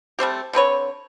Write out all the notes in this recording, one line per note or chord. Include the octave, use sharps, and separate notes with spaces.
G3 A3 C4 G4
D3 C4 B4 C#5